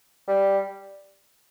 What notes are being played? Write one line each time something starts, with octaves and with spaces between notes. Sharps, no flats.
G3